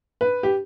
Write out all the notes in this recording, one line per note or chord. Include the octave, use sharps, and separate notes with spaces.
B4
G4